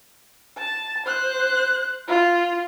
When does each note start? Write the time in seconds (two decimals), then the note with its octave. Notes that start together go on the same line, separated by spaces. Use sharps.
0.58 A5
1.06 C5 F#6
2.08 F4